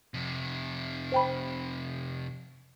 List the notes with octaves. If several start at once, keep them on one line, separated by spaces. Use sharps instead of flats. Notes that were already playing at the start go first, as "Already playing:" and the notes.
F2 C3
C5 G5 B5